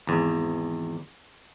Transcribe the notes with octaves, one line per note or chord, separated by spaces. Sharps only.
G#1 E2